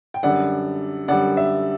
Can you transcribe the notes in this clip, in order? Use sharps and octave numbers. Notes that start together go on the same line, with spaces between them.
G5
F#2 D3 G3 D5 F#5
F#2 D3 G3 D5 F#5
E5